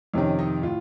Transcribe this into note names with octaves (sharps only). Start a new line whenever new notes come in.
F2 C3 D#3 C#4
D#4
A2 F4